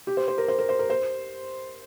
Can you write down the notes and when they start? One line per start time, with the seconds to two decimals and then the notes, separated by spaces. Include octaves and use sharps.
0.07 G4
0.17 C5
0.28 C5
0.38 A#4
0.48 C5
0.59 A#4
0.69 C5
0.79 A#4
0.90 C5